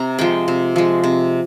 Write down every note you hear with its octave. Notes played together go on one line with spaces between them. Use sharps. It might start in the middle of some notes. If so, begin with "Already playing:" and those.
Already playing: C3 A#5
F3 G#3 G5
C3
F3 G#3
C3